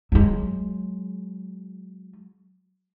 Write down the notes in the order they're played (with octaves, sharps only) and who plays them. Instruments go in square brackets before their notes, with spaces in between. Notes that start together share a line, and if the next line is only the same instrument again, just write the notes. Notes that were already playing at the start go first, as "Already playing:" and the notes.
[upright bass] F#3 G#3